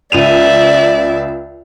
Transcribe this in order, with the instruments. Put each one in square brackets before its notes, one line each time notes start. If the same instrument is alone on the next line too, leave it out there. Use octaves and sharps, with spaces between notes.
[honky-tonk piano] C#2 D#7 F7 [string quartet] D5 E5